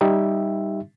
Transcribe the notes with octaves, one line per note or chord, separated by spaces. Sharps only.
G3 D#4 G4 E5